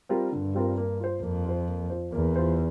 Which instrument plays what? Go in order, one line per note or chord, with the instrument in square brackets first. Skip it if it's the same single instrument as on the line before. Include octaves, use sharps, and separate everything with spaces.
[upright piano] G3 C4 F4 A#4
[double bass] G2 [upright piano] D3
[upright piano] G3 C4 F4 A#4
A#3
F4 C5
[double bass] F2 [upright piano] A#3
[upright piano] F4 C5
A#3
F4 C5
[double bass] E2 [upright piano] A#3
[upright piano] F4 C5